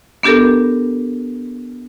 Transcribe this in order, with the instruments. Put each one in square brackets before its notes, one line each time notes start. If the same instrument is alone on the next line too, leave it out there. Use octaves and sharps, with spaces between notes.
[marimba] B3 D4 G4 A4 A#4